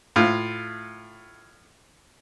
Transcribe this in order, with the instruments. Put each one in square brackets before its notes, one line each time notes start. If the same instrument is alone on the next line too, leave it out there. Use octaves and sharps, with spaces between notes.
[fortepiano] A2 F4